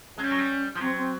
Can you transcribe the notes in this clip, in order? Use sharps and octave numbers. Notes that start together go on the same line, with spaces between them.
G#3 C#4
G3
F#3
G3
F3
F#3 C4
C4